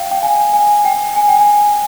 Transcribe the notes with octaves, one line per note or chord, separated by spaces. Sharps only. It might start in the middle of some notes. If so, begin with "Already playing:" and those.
Already playing: F5 G5
G5
G#5
G#5
G5
G#5
G5
G#5